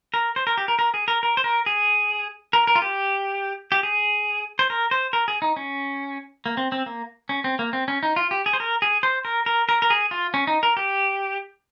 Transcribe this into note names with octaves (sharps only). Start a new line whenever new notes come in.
A#4
C5
A#4
G4
A#4
A#4
G#4
A#4
A#4
C5
A#4
G#4
A#4
A#4
F4
G4
G4
G#4
C5
A#4
C5
A#4
G#4
D#4
C#4
A#3
C4
C4
A#3
C#4
C4
A#3
C4
C#4
D#4
F4
G4
G#4
C5
A#4
G#4
C5
A#4
A#4
A#4
A#4
G#4
F4
C#4
D#4
A#4
G4